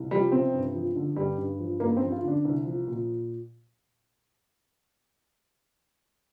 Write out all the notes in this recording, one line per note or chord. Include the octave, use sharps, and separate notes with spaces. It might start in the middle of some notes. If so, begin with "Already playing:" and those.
Already playing: C2
F3 G3
C3 C4
G2
F3
D3
G2 G3
G2
F3
G2 A#3
C4
F3
F4
D3 D4
C2
F3
A#2